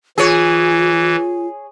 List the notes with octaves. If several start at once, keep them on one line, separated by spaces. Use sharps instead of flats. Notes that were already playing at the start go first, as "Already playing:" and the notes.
E3 F4 G#4 C#5